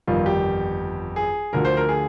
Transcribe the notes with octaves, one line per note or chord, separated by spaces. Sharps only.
G1 F2 D#3 G3 F4
G4
G#4
D2 D3 F3 A#4
C5
A#4
G#4